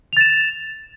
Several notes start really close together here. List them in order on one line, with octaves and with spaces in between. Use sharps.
F7 A6 E7